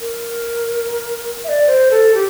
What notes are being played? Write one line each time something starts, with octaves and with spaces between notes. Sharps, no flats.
A#4
E5
D5
C5
A4
G4